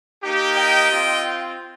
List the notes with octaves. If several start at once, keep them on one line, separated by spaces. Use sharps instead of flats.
A#3 D#4 G4
D#5 G5
C4 F4